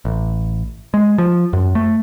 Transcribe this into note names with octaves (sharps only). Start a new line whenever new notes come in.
A1
G#3
F3
F#2
A3